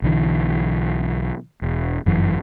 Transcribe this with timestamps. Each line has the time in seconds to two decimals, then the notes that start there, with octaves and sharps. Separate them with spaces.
0.02 B1 D3 E3
1.62 E1
2.06 G1 F#2 E3